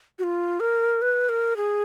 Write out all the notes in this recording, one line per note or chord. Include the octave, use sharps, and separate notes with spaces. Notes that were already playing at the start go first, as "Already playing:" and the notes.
F#4
F4
A#4
B4
A#4
G#4